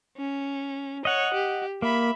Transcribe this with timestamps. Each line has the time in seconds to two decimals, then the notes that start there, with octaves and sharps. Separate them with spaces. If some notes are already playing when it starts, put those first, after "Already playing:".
0.17 C#4
1.05 C#5 D#5 F#5
1.34 G4
1.82 A#3 E5 B5